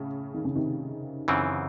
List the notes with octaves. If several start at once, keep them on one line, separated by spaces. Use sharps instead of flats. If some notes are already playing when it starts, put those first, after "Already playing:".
Already playing: A2 C#3
D#3
C#3
C3 D#3
F#2 C#3 E3 C4